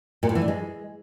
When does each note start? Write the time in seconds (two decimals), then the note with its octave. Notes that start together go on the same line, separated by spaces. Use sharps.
0.23 A#2
0.29 A2
0.35 E3
0.42 D4
0.48 G#3